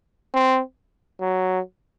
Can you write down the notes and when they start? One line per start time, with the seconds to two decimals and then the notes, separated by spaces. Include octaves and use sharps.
0.34 C4
1.21 F#3